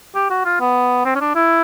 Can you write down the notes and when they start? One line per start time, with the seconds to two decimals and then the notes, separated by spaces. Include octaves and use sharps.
0.15 G4
0.30 F#4
0.45 F4
0.60 B3
1.05 C4
1.15 C#4
1.20 D4
1.35 E4